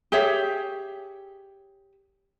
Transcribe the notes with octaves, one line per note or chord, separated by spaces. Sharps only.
G4 G#4 C#5 E5